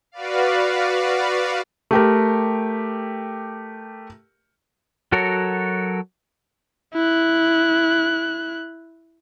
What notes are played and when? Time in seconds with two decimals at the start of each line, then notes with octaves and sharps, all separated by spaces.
0.12 F#4 B4 D5 F5
1.91 A3 G4 A#4
5.12 F#3 F#4 A4 A#4 C#5
6.94 E4 F#6